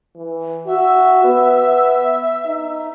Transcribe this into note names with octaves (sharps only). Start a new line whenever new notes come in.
E3
F#4 E5
B3
D#4